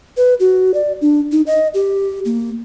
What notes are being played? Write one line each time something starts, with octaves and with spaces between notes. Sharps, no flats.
B4
F#4
D5
D4
D#4
D#5
G4
A#3